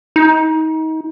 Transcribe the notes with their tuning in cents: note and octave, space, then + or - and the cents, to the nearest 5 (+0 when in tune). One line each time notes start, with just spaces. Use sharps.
D#4 +30